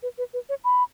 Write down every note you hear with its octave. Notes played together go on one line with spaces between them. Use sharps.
B4
B4
B4
C#5
B5